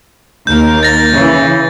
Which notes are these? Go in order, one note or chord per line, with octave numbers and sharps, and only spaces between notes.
D#2 A#4 G6
A6 A#6
C#3 E3